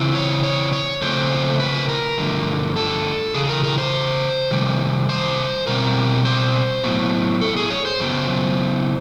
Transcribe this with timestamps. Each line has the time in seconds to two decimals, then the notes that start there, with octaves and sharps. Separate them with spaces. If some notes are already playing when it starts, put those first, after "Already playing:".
Already playing: C#3 E3 C4
0.15 C#5
0.43 C#5
0.73 C#5
1.02 C#3 F3 A3 C4 C5
1.60 B4
1.89 A#4
2.18 G2 D3 F3 A3
2.76 A4
3.34 E2 C#3 G#4
3.49 A#4
3.64 A#4
3.78 C5
4.51 C3 D#3 G3
5.09 C5
5.67 B2 G3 C4 A#4
6.25 C5
6.84 A2 F#3 B3
7.41 A4
7.56 G#4
7.70 C#5
7.85 C5
8.00 F#2 C#3 F#3 B3